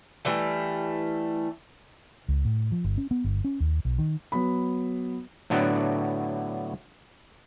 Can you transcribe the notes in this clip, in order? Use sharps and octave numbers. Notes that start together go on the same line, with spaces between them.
E3 G3 A3
C#2
A2
F3
G1
C#4
B3
G1
C#4
D#2
B1
D#3
F#3 B3 B5
A2 D3 F#3 B3 D4 F#4